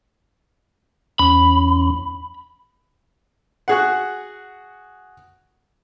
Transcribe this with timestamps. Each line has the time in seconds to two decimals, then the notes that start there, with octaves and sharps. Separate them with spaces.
1.19 E2 C#4 B5
3.68 F#4 G#4 F#5